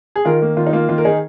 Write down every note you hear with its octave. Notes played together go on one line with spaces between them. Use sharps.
G#4
D#3 F4 A#4
A#3
D#3 F4
D#4
A#3 F4
D#3 F4
A#4
D#3 D#4 G#4